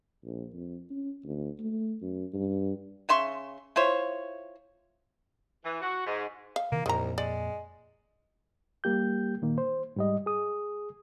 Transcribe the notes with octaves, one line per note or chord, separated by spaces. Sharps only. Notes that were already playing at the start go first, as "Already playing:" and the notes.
A#1
F2
C#4
D2
A3
F#2
G2
C#3 E5 C6 C#6
E4 F4 C5 C#5
E3
F#4
G#2
F5
C3 D#3 E3 A#3
C2 F2 A#2 D#3 A#5
G#3 D5
G3 A#3 G4 G6
A#2 D#3 A#3
C5
G#2 G3 D#5
G#4 D#6